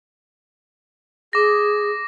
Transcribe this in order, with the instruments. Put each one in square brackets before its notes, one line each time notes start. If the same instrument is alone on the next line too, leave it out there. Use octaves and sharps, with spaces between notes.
[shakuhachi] G#4 [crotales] D6 A#6